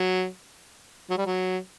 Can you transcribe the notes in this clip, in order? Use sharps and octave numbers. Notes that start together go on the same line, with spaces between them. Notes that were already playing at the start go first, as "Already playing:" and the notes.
Already playing: F#3
F#3
G3
F#3